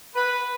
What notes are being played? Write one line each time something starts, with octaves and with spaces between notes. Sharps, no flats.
B4